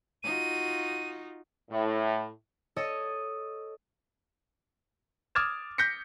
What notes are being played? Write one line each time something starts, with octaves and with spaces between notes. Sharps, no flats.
D#4 F4 F#4 D#7
A2
A4 C#5 D#5 D#6
D6 D#6 F6 G#6 A6 E7
G6 A#6 B6 C#7